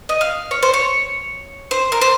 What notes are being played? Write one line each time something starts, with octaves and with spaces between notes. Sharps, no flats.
D#5
F5
C#5
C5
C#5
C5
A#4
C5